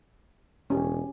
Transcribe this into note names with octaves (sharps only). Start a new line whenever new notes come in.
E1 C#4 G4